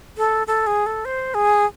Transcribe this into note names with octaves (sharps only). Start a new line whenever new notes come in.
A4
A4
G#4
A4
C5
G#4